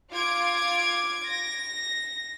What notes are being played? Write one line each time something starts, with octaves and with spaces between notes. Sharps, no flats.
F4 D6 G#6 D7
A#6